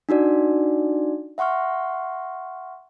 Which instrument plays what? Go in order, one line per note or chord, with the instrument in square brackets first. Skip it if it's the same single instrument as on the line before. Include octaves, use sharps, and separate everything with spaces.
[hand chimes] D4 D#4 F#4 D5
E5 F#5 C6 C#6 F6